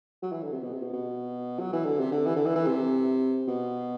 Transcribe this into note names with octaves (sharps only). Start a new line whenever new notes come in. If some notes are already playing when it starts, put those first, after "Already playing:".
F#3
E3
D3
C3
B2
C3
B2
B2
F#3
E3
D3
C3
D3
E3
D3
E3
E3
C3
B2